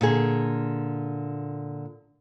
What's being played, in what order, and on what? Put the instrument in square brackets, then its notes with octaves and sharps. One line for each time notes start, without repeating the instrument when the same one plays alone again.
[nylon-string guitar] A#2 D3 G#4